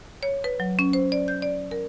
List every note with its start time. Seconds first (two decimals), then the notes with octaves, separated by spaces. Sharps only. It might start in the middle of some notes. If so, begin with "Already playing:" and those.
0.23 C#5
0.44 B4
0.60 F#3
0.79 C#4
0.93 C5
1.12 D5
1.28 G6
1.42 D5
1.71 A#4